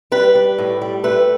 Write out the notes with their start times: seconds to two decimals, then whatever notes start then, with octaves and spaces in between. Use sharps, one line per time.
0.12 G3 B4
0.35 G3
0.58 A2
0.82 G3
1.04 A3 B4